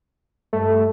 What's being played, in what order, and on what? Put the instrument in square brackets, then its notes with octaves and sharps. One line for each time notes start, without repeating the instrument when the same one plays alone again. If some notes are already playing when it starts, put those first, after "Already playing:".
[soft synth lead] G2 [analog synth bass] A3